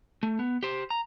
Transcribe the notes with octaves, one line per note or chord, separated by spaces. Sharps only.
A3
B3
G4 C5
A#5